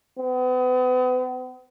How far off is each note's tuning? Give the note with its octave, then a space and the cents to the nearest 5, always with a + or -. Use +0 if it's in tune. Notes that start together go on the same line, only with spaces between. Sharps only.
B3 +40